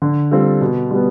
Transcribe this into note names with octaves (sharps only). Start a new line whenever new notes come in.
D3
G3 C4 F4 A4
B2
G3 B3